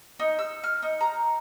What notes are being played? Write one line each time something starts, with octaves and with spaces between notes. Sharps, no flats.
D#4
E6
F6
D#4
A#5